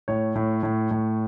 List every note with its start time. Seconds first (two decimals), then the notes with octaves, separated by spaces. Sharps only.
0.08 A2 C#5
0.35 A2
0.63 A2
0.91 A2